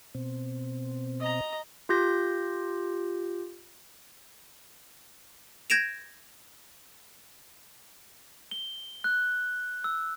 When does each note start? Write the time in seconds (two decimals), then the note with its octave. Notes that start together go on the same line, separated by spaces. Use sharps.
0.15 B2 C4
1.20 D#5 A#5
1.89 F4 G4 G6 A#6
5.70 G6 G#6 A#6 D7 E7 F7
8.51 G7
9.04 F#6
9.84 E6